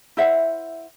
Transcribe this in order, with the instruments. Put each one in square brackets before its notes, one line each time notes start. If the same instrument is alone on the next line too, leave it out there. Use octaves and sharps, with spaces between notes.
[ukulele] E4 C5 E5 F#5